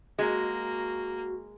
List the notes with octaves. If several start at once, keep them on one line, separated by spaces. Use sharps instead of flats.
G#3 A#3 F#4